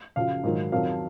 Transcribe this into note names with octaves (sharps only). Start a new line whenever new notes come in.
F#2 C#3 F3 F5
G#2 D#3 F#3
F2 D#3 F#3 F5